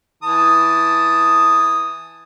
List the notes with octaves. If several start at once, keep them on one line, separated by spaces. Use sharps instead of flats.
E3 A5 D#6